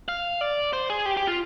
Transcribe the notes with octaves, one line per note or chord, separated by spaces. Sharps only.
F5
D5
C5
G#4
G4
G4
F4